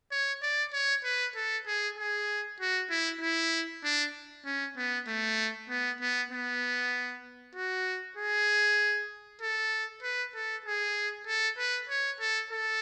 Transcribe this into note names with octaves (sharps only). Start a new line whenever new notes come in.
C#5
D5
C#5
B4
A4
G#4
G#4
F#4
E4
E4
D4
C#4
B3
A3
B3
B3
B3
F#4
G#4
A4
B4
A4
G#4
A4
B4
C#5
A4
A4